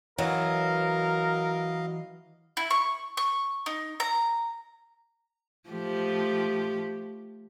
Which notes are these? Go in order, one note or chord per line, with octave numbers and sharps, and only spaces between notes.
E3 F#3 A#4 D#5 F5
E4
C#6
C#6
D#4
A#5
F3 A3 G4